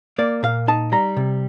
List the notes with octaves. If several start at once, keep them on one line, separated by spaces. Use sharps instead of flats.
A#3 D5
A#2 F5
D#4 A5
G3 A#5
C3